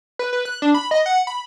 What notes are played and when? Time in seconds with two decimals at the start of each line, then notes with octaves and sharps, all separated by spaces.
0.19 B4
0.33 B4
0.45 F#6
0.62 D4
0.74 B5
0.91 D#5
1.06 F#5
1.27 B5